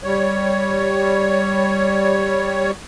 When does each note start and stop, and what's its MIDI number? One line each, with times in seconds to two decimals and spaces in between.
0.04 2.71 55
0.04 2.71 73